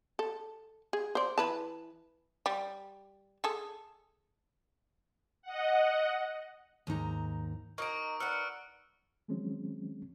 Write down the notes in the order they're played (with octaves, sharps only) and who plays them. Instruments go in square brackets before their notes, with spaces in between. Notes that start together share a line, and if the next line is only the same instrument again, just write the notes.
[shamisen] A4
G#4
C5 D5
E3 B4 A5
G3
G#4 A4
[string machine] D#5 F#5
[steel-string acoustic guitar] D#2 G#2 D#4 A#5
[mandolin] A#3 D#4 F#4 [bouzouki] D#5 A#5 [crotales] C#6 D#6 D7
[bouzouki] B4 D5 F#5 [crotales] E6 F6 C#7
[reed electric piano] D#3 F3 F#3 G#3 C4 C#4